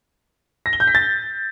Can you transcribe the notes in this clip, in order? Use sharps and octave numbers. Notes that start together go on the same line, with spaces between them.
A#6
G7
G6
B6
A6